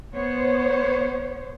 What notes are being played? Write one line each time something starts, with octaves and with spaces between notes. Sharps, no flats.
B3 C5 C#5